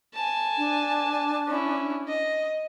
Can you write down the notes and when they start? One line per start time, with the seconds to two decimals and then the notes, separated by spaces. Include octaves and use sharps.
0.15 G#5 A5
0.58 D4
1.47 C#4 E4
2.08 D#5